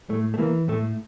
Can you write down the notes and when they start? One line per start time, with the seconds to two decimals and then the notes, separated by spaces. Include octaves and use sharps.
0.09 A2 A3
0.34 A3
0.38 E3 A#3
0.68 A2 A3